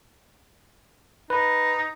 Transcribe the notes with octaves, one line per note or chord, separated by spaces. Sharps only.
D#4 B4